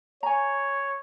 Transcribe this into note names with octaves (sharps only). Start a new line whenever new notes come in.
C#5 G#5 A#5